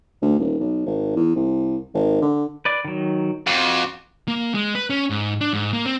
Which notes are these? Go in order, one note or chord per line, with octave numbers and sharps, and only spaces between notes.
D2
D#1
B1
G#1
E2
C2
G#1
D3
B4 D5
D#3 F#3
F2 F#4 D6
A#3
G#3
B4
C#4
G#2
D4
G#2
A#3
C4